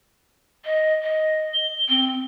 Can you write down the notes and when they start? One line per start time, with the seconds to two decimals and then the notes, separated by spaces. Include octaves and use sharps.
0.65 D#5
1.03 D#5
1.54 G7
1.89 C4